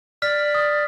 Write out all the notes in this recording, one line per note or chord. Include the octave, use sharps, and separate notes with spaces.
D5 F6 B6
D#6